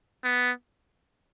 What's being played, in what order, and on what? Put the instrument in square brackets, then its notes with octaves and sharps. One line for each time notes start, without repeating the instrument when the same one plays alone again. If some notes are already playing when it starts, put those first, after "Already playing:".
[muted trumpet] B3